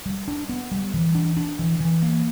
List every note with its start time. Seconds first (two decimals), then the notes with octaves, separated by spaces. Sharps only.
0.06 G3
0.28 D4
0.49 B3
0.72 G3
0.94 E3
1.15 D4
1.37 D4
1.59 E3
1.80 E3
2.02 A#3